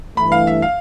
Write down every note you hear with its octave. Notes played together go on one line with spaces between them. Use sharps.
G2 E3 A3 B5
F5
E5
F5